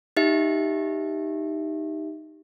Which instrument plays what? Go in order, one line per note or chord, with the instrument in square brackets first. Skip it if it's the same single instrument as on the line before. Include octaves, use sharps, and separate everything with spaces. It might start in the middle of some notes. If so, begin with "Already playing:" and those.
[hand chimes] D#4 G4 E5